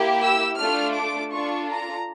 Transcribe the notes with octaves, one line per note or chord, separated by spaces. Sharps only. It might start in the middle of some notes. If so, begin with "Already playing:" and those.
Already playing: A#3 E4 G4
E6
A3 D4 F4 A4 F6
D6
D4 F4 A4 C#6
A#5